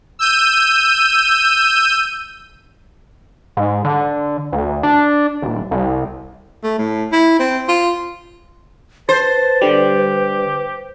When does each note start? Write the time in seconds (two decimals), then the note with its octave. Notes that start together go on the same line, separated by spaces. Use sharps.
0.19 E6 G6 D#7
3.57 G#2
3.85 D3
4.52 D2
4.83 D4
5.42 D#1
5.71 C2
6.63 A3
6.78 A2
7.12 E4
7.39 C4
7.68 F4
9.09 B4 C5 A5
9.62 D3 G3 G4